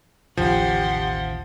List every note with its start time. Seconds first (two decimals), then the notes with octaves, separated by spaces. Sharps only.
0.37 A1 D#2 C#3 F3 G4 F#5 C6